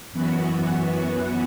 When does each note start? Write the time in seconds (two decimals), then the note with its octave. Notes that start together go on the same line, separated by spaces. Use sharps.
0.12 F#2 E3 B3 F#4